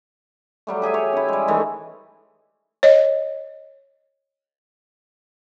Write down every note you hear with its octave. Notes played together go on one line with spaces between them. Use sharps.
F#3 G3 A3
G4 G#4 E5 G#5
C#5
C#4 E4
G3 G#3
D#3 E3 G#3 A3
C#5 D#5